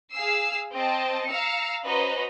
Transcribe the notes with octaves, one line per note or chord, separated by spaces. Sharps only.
G#4 F5 E6 C7
C4 D#5 G5 A5
F5 A#5 E6 C#7
C#4 F#4 B4 C5 D#5 A#5